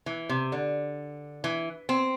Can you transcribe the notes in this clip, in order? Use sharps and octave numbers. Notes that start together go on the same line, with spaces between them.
E3
C3
D3
E3
C4